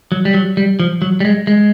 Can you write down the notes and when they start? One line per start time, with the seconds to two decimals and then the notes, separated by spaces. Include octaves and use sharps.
0.12 F#3
0.25 G3
0.34 F#3
0.57 G3
0.80 F3
1.02 F#3
1.20 G3
1.25 G#3
1.47 G#3